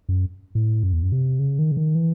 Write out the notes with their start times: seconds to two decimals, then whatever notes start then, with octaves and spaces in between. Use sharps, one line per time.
0.09 F#2
0.55 A2
0.83 F#2
0.93 E2
1.03 F#2
1.12 C3
1.39 C#3
1.59 D#3
1.71 C#3
1.77 D#3
1.95 E3